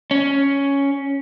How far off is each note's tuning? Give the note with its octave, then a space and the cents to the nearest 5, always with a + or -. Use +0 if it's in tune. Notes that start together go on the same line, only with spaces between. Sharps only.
C#4 +5